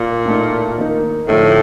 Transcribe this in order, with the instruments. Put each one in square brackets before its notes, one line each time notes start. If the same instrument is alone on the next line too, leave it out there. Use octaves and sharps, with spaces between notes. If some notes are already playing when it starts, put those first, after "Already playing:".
Already playing: [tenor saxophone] A#2
[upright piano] A2 A3 D#4
D#3 A#3 D#4
[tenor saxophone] A2 [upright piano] D3 F3 A3 D#4